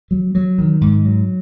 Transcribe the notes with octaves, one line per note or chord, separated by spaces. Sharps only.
F#3
F#3
D#3
G#2
F#3